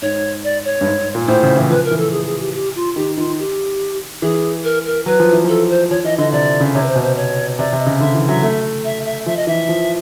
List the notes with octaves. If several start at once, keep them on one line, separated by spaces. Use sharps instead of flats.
G#2 C#5
D5
C#5
G2
G#2
A#2
A2 C5
C#3
E3
F3 B4
A#4
E3
A4
G#4
G#4
G4
G4
F4
D#3 G4
D#3 F4
G4
E3 G#4
A#4
A#4
F#3 B4
F3
E3
F3 A4
C5
F3 C#5
E3 D#5
D3 D#5
C3 D5
C#3
C3 C#5
B4
C5
B2
C5
C#5
C3 D5
C3
D#5
C#3
D3 E5
E3
F#3 E5
A3
E5
E5
F3 E5
D#5
E3 E5
F3